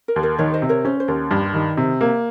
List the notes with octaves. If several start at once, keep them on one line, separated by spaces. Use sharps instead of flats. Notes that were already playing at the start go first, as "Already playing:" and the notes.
A#4
D#2
A#4
D#3 A#4 C#5
C5 D#5
C3
A#4 C#5
C#4 C5
C5
D#2 A#4
G2 G4
D#3
C3
A#3